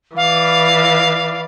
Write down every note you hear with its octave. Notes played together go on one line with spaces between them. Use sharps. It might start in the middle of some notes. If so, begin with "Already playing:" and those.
E3 D5 F5